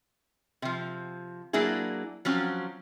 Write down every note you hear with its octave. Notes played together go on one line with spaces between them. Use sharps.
C3 F3
F#3 A#3 D4 E4 G#4
F3 F#3 C4 C#4